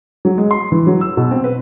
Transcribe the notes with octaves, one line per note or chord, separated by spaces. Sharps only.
F#3
G#3
C6
E3
F#3
E6
B2
C4
B4